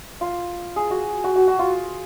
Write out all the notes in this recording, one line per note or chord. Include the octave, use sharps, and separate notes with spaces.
F4
G#4
F#4
F#4
F#4
F#4
F4